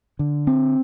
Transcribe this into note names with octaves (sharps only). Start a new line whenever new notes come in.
D3
C4